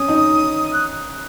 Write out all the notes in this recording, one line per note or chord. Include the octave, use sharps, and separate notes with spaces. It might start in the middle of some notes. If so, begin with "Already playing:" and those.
Already playing: C#4 D#6
D#4
F#6